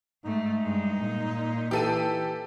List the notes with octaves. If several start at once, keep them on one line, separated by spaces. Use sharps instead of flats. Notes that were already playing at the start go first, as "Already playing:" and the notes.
G#2 A3 D#4
G2 G#3
A#2
E3 G4 A4 D#7